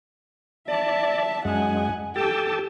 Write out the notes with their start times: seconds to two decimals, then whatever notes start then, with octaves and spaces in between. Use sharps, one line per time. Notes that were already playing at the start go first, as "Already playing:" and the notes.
0.68 D5 E5 A5
1.45 F#2 G#3 F#5 G#5
2.16 G4 A4 G5 A5